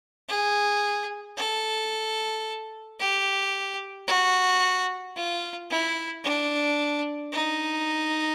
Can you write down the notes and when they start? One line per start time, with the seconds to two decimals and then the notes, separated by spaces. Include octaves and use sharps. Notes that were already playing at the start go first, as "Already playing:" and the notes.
0.29 G#4
1.37 A4
3.00 G4
4.08 F#4
5.16 F4
5.71 E4
6.25 D4
7.33 D#4